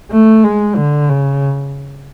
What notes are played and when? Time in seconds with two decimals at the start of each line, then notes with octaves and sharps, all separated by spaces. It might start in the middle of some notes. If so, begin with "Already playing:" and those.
0.11 A3
0.44 G#3
0.76 D3
1.10 C#3